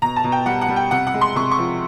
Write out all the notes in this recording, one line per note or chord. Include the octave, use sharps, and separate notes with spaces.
B2 A#5
A5
B2
G5
G3 F#5
F#5
G3
G5
C3 F#5
F#5
G#3
C6
C3 C#6
C#6
F3